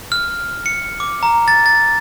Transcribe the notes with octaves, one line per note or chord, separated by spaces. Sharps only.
F6
C#7
D6
A#5
A6
A6